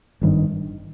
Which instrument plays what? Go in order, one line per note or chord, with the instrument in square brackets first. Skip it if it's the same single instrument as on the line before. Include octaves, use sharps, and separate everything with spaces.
[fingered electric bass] G#1 G2 D#3